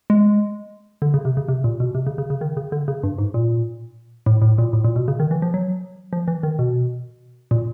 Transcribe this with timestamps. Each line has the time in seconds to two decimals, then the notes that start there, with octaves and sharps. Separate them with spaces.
0.10 G#3
1.02 D3
1.14 C#3
1.25 C3
1.37 C#3
1.48 C3
1.64 A#2
1.80 B2
1.95 C3
2.07 C#3
2.18 C#3
2.30 C#3
2.41 D#3
2.57 C#3
2.72 D3
2.88 C#3
3.03 G2
3.18 G#2
3.34 A#2
4.26 A2
4.42 A2
4.58 A#2
4.73 A2
4.84 A#2
4.96 B2
5.08 C#3
5.20 D#3
5.31 E3
5.42 F3
5.54 F#3
6.13 F3
6.28 E3
6.43 D#3
6.59 B2
7.51 A#2